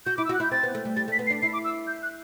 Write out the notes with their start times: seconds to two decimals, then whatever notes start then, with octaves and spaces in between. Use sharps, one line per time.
0.06 F#4 G6
0.17 E4 D6
0.25 E6
0.29 F#4 F#6
0.40 E4 G6
0.51 C4 A6
0.63 B3
0.75 A3
0.85 G3
0.96 G3 A6
1.08 A3 B6
1.19 B3
1.27 C7
1.30 D4
1.42 E4 C7
1.53 D6
1.65 E6
1.87 G6
2.02 F#6